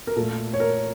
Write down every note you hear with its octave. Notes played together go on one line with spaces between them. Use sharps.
A#4
A#2 A3 A4
C#5
A#4